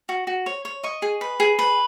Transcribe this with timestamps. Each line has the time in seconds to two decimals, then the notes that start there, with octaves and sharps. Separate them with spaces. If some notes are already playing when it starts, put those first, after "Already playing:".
0.09 F#4
0.27 F#4
0.46 C#5
0.65 C#5
0.84 D#5 C#6
1.02 G#4
1.21 B4
1.40 G#4
1.59 B4